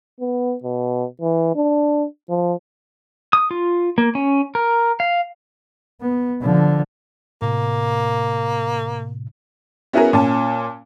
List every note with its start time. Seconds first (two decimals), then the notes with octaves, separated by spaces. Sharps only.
0.20 B3
0.64 B2
1.21 E3
1.55 D4
2.29 F3
3.33 D#6
3.51 F4
3.98 A#3
4.15 C#4
4.55 A#4
5.00 F5
6.01 B3
6.41 D3 F3
7.42 A2 C3 A#3
9.93 B3 C#4 E4 F#4 G#4 A#4
10.13 A#2 C#4 A5